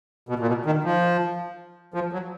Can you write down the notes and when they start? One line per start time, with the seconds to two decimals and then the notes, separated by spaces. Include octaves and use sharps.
0.29 B2
0.39 A#2
0.48 B2
0.66 D#3
0.84 F3
1.94 F3
2.13 F#3